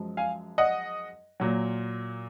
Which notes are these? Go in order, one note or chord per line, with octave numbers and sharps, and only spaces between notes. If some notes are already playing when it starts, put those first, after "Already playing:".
Already playing: F#2 F3 G#3
F5 G#5
D#5 F#5
A#2 F#3